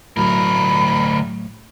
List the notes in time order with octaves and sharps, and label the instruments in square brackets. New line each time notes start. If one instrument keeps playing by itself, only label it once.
[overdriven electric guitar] D2 A#4 [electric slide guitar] A2 F#3 [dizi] B5